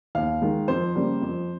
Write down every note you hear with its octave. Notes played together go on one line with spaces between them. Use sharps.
D#2 F5
D#3 G#3
F2 C5
C#3 G3 A#3
F2